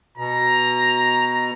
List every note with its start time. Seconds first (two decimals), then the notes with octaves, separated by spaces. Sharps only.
0.18 B2 A#5